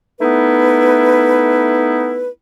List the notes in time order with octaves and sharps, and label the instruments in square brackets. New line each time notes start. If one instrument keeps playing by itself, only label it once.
[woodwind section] A3 B3 D#4 E4 B4